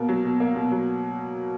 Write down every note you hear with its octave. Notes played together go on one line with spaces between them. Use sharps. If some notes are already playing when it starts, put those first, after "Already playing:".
Already playing: B2 A#3
F#3
B2
A#3
B2
F#3